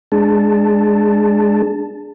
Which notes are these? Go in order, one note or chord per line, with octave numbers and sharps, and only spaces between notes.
G#3 D4 G#4 A5